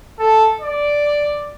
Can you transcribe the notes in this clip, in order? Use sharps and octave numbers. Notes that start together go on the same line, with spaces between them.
A4
D5